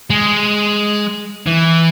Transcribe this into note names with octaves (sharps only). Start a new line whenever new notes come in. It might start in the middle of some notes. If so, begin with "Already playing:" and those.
G#3
E3